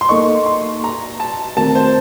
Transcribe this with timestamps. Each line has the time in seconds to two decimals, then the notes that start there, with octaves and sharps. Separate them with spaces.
0.01 C6
0.09 A#3 D#4 A4 D#5 C#6
0.46 C6
0.84 A#5
1.20 A5
1.57 D#3 A3 C4 F#4 A#4 A5
1.75 C5